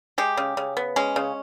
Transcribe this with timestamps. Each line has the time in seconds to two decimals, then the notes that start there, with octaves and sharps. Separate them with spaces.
0.18 G#3 G4
0.37 C#3
0.57 C#3
0.77 B3
0.96 G#3 C#4
1.16 C#3